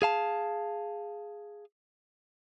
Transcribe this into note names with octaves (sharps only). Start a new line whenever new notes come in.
G#4 F5 A5